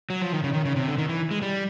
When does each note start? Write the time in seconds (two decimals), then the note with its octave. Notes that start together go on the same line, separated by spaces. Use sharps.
0.10 F#3
0.22 F3
0.32 D#3
0.44 C#3
0.53 D#3
0.65 C#3
0.76 C3
0.87 D3
0.98 D#3
1.09 E3
1.31 G#3
1.42 G3